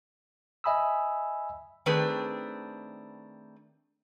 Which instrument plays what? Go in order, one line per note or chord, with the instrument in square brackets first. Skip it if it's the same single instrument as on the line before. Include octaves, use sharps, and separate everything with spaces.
[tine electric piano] D#5 E5 G#5 B5 D#6 E6
[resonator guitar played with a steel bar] D#3 A3 C4 D4 G#4 B4